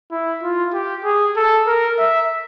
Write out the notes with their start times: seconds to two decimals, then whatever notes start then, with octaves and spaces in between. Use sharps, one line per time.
0.11 E4
0.43 F4
0.74 G4
1.04 G#4
1.36 A4
1.67 A#4
1.98 E5